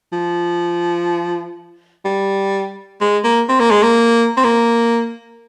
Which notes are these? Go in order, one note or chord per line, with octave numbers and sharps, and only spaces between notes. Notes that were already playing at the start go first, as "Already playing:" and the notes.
F3
G3
G#3
A#3
C4
A#3
G#3
A#3
C4
A#3